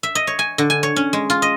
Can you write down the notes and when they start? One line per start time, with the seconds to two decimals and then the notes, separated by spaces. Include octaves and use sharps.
0.03 E5
0.15 D#5
0.27 C#5
0.39 G#5
0.58 D3
0.70 G#5
0.83 C#5
0.96 C#4
1.13 G#3
1.30 F4
1.42 D#5